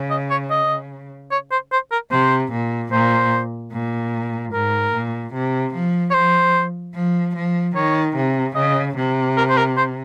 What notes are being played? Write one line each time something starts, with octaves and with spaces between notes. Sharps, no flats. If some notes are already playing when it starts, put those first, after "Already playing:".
Already playing: C#3
D#5
C#5
D#5
C#5
C5
C5
A#4
C3 C5
A#2
A#2 C5
A#2
G#2 A#4
A#2
C3
F3
C#5
F3 C5
F3
F3
D#3 C#5
C3
C#3 D#5
C3
A#4
C5
A#4
C5